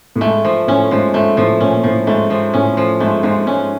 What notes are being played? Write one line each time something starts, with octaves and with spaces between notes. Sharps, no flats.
A2
G#2 A3
F3
A2 C#4
G#2 F3
G#2 A3
A2 F3
A#2 C#4
A2 F3
G#2 A3
F3
A2 C#4
F3
G#2 A3
G#2 F3
G#2 C#4